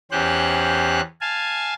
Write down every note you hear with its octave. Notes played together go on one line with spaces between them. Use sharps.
E2 C#4 G4 C5 F#6
F5 G#5 A5